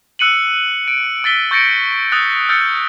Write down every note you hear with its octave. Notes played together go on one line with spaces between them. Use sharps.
E6 F#6 C#7 D#7 F#7
D7
E6 A6 B6 G7
C#6 G6 A6 A#6 C#7 D7
D#6 E6 F#6 A6
E6 F6 G6 A6 C#7